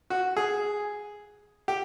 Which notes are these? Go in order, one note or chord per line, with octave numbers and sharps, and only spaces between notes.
F#4
G#4
G4